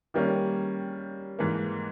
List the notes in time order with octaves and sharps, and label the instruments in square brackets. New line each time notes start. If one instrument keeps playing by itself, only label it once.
[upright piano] D#3 G3 A#3 C#4
G#2 E3 A#3